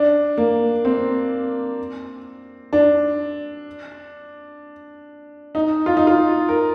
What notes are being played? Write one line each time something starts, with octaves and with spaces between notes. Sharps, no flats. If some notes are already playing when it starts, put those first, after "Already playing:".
Already playing: D4
A#3
C4
D4
D#4
F4
D#4
F4
A#4